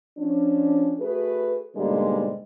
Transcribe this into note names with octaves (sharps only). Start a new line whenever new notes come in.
F3 C#4 D4
A3 F#4 G#4 B4
G#2 B2 D3 G3 G#3 A#3